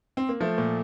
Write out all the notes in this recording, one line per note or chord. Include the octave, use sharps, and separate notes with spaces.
C4
A#3
F3 A3
A#2